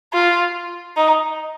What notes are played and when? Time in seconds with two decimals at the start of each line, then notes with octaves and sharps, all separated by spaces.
0.14 F4
0.97 D#4